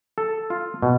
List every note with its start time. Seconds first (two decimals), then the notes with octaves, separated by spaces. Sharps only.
0.18 A4
0.50 F4
0.82 B2